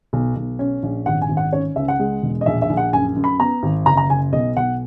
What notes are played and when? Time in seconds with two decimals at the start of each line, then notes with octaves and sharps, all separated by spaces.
0.13 B1
0.36 B1
0.59 C#4
0.83 A#1
1.06 G#1 F#5
1.22 G#5
1.29 G#1
1.37 F#5
1.53 C#4 C#5
1.76 C#2 E5
1.88 F#5
1.99 G#3
2.22 E1
2.41 D#5
2.46 A#1 E5
2.62 E5
2.69 A#1
2.77 F#5
2.93 F#2 G#5
3.16 F#2
3.24 B5
3.40 B3 A#5
3.63 G#1
3.86 F#1 A#5
3.97 A#5
4.10 F#1 G#5
4.33 B1 D#5
4.57 B1 F#5